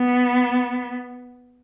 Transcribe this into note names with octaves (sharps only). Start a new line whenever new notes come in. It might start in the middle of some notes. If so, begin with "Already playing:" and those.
Already playing: B3